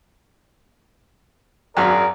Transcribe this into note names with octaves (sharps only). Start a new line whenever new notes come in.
G#1 F#2 G#4 A#4 D5